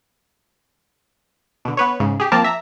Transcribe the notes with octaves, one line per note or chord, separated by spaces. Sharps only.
B2 D3
B3 B4 C#5
G#2 C#3
G4 G#4
F3 A#3 C4 A#4 A5 D6
E5 A#5